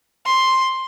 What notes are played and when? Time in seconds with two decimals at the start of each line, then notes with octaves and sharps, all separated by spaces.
0.25 C6